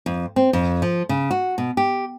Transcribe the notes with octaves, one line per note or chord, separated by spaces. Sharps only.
F2
C4
F2
F3
C#3
F#4
B2
G4